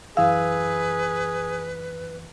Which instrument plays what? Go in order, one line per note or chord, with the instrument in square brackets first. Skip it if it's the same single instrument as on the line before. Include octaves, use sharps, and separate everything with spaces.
[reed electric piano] F#2 E3 E6 [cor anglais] G#4 [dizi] B4 [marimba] F5